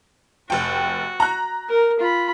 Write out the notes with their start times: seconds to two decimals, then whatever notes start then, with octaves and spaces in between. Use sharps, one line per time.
0.50 F1 F#4 G5
1.20 A#5 F#6
1.69 A#4
1.99 F4 B5